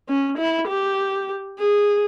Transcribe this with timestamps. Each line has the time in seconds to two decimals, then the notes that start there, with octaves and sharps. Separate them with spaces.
0.08 C#4
0.38 E4
0.68 G4
1.59 G#4